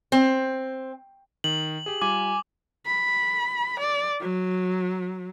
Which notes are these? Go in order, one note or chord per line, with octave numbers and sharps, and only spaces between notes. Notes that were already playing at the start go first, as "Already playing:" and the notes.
C4
D#3 F#7
G4 G#4
G3 F4 G#5 D6
B5
D5
F#3